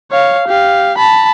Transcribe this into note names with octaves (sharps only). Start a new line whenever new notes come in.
C#5 F5
G4 F5
A5 B5